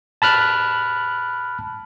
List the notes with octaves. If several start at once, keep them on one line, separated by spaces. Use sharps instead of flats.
A5 B5 F6 F#6